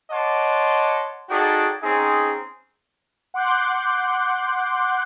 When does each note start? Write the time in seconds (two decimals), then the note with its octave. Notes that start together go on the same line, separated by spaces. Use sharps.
0.11 C#5 D#5 F#5 A5 C6 D6
1.29 D#4 F#4 G#4 A4 D5 G5
1.83 C4 C#4 D#4 G#4
3.34 F#5 C6 D6 F#6 G6